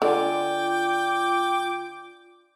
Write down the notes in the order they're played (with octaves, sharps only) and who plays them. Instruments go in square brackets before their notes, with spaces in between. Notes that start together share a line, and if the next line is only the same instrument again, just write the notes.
[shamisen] D3 [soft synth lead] F4 [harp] D5 G#5 [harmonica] G5 D6